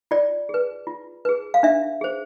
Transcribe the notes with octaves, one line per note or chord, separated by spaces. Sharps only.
F4 D5
G#4 B4
F4
G#4 B4
F5
D4 E5
G#4 C5